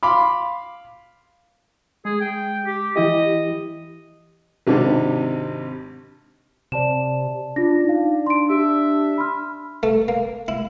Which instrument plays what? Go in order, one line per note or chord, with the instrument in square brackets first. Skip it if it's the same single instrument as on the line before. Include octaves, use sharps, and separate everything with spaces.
[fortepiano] F5 B5 C6 D6
[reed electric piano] G#3 [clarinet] G#4
[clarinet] G5
G4
[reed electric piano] E3 E4 G4 [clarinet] D#5
[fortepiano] G#1 C3 D4 D#4
[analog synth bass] C3 [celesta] D5 A5 E7
[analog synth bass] D4 [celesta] F4 A#6
[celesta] D#4 F5
C6 D7
[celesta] G4 [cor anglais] E5
[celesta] B5 C6 F6
[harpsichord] A3
A#3
E4